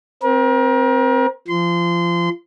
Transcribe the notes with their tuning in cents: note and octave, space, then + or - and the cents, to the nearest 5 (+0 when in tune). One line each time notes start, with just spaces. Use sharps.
C4 +0 A#4 +35
F3 -25 C6 -25